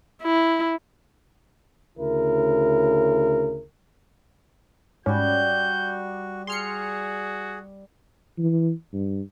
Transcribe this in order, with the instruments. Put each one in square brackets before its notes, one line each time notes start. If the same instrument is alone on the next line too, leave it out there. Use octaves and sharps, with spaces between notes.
[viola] E4
[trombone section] D2 C#3 E4 A#4
[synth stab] G#2 C#4 [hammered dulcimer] G3 D5 [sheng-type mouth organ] F#4 [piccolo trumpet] G6
[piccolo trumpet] F#4 [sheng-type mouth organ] G#4 [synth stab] C6 F6 C#7
[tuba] E3
G2